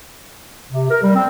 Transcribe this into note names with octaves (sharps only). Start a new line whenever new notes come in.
C3
A#4
G3
C4